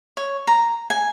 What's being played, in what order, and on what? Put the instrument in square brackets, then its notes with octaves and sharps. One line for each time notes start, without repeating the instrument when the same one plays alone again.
[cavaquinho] C#5
A#5
G#5